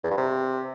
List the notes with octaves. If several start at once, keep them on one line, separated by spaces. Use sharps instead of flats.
E2
G2
C3